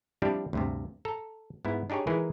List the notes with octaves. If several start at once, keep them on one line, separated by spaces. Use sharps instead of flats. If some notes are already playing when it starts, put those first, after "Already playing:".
F3 G3 C4 D4 E4 G4
D2 G2 C3
A4 A#5
G#2 B3 E4
D4 D#4 G4 G#4 C#5
E3 G#3 D#4 E4 G#4 A#4